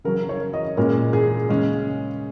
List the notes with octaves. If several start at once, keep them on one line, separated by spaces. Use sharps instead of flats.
C#3 F#3 C#4 A#4
C#5
D#5
A#2 G#3 C#4 A#4
G#4
C#3 G#3 C#4